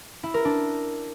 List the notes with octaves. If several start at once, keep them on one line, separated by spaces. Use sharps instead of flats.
E4
A#4
D4